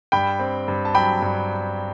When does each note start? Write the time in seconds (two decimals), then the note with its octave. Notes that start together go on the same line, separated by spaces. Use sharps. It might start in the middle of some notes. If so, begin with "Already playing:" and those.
0.12 G2 G5 B5
0.39 C4
0.68 G2
0.85 A5
0.95 F#3 G5 B5
1.22 G2